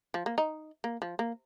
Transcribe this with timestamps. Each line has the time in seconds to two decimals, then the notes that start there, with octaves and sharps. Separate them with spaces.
0.14 F3
0.26 A#3
0.38 D#4
0.84 A#3
1.02 F3
1.19 A#3